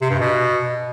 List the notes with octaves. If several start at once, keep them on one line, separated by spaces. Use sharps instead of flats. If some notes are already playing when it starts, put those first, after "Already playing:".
C3
G2
B2